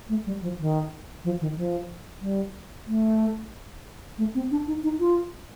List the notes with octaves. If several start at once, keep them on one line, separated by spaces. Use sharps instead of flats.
A3
G3
F3
D#3
F3
D#3
F3
G3
A3
A3
C4
D4
D#4
D#4
F4